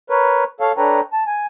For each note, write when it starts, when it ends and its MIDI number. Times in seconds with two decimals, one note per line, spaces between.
0.10 0.44 70
0.10 0.44 71
0.10 0.44 73
0.60 0.72 69
0.60 0.72 73
0.60 0.72 77
0.77 1.01 62
0.77 1.01 69
0.77 1.01 71
0.77 1.01 73
0.77 1.01 79
0.77 1.01 82
1.13 1.24 81
1.27 1.46 80